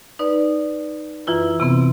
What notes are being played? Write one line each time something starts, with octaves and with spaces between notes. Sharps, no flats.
D#4 B4 D5
F#2 E3 E4 F4 B4
C3 B3 C4